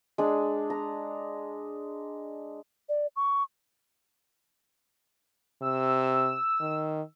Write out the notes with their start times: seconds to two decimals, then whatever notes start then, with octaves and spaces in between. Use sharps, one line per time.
0.18 G#3 D4
0.70 A#5
2.89 D5
3.16 C#6
5.62 C3 E6
6.61 D#3